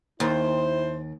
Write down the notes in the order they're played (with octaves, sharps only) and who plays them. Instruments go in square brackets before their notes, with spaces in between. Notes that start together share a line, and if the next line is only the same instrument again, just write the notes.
[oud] D#2 [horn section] E4 C5